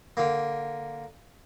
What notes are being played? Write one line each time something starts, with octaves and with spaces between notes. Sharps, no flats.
D3 A#3